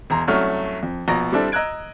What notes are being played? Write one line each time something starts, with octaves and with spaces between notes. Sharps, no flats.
E1 A#5 C6
C2 F#3 A3 C#4 F6
F2
A#1 B2 A#5 A#6
G3 C4 D4 E4 A4
D#5 A#5 E6 F#6 G#6 D7